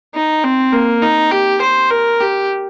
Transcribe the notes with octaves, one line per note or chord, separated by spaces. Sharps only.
D#4
C4
A#3
D#4
G4
C5
A#4
G4